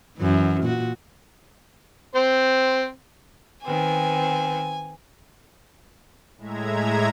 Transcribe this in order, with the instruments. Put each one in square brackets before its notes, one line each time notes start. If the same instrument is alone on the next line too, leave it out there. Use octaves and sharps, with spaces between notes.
[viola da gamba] F#2 E3
A#2 F#4
[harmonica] C4 C5
[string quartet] D#3 B3 C4 [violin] G#5
[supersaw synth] A2 G#3 E5 A#5 G#6